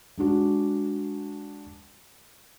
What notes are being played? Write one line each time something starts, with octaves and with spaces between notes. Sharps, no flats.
G#3 D4 F#4